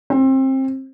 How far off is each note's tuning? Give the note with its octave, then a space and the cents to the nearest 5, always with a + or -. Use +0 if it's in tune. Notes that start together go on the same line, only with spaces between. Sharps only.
C4 +25